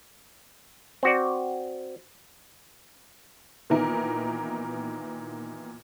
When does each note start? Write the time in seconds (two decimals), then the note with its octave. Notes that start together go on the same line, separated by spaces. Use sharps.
1.03 C4 F#4 D5
3.70 A#2 D#3 E3 B3 D#4 A#4